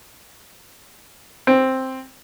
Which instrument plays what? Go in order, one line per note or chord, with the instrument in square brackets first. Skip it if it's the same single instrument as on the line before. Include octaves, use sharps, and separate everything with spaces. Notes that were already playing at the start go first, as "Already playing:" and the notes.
[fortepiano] C4